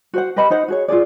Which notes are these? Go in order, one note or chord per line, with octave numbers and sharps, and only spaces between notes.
F#4 C5 F#5
G4 B4 D#5 B5
D#4 C5 F#5
F#4 G#4 C#5
F4 F#4 G#4 D5